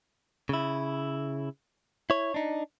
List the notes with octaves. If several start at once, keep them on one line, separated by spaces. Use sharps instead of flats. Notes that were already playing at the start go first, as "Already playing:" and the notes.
C#3 E4
E4 C#5
D4 D#4